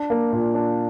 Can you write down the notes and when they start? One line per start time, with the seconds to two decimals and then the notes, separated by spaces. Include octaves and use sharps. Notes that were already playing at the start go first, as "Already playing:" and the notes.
Already playing: D4
0.10 A#3
0.32 A#2
0.54 D4